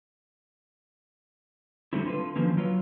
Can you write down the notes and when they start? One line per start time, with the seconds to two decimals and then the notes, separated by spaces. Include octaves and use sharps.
1.93 D3 F#3 G3 A3 C4 E4
2.06 D3 F4 B4
2.36 D3 D#3 F3 F#3 A#3 C#4
2.57 F#3 F4 B4 C#5